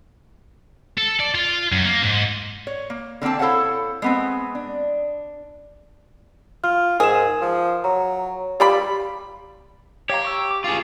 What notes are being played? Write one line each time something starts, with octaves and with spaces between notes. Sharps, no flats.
A4
D5
F4
F#2
A#3
G#2
C#5
A#3
D3 A#3 C4 G5 A5
E4 A4 C5 C#5 F5 F#5
G#3 B3 C4
D4
F4 F6
G#2 G#4 A#4 E7
F3
F#3 A#5
G3 F4 G4 D5 B5
G4 C#5 F5 A#5
A#5 C#6 E6
D6
F4 G#4